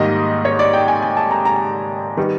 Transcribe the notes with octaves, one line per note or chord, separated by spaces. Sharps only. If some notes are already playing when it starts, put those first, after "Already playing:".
Already playing: G#2 D#3 G3 A#3 D#5
C#5
D5
G5
G#5
G#5
A5
A#5
A#5
D#3 G3 B3